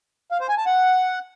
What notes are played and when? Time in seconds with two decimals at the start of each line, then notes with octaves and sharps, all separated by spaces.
0.32 F5
0.40 C5
0.49 G#5
0.58 A5
0.66 F#5